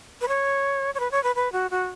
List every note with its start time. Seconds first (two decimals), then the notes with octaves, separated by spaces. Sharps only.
0.21 B4
0.28 C#5
0.94 C#5
1.00 B4
1.11 C#5
1.23 B4
1.35 B4
1.52 F#4
1.71 F#4